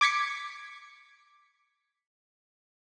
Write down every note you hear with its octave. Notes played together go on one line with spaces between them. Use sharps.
D6 G#6 B6 C#7